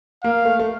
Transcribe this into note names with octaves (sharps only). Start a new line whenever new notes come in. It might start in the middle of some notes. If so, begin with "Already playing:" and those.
A#3 F5
A3
A3